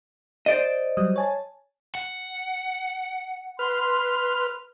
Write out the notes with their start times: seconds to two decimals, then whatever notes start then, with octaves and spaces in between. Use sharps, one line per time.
0.46 C5 D5 D#5
0.97 F#3 G3 D#6
1.16 C#5 G#5 A5
1.95 F#5
3.59 B4 C6 F6